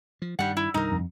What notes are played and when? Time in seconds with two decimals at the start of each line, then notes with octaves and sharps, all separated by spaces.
0.22 F3
0.39 G2 D#3 G3 F#5
0.57 E4
0.74 C2 G2 D#3 D#4 A#4
0.92 F2